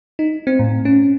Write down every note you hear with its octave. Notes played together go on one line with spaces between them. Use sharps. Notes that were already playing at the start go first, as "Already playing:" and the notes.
D#4
C4
A2
C#4